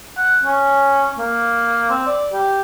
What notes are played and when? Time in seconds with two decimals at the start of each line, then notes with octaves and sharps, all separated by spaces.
0.17 F#5
0.43 C#4
1.18 A#3
1.90 C4
2.06 D5
2.33 G4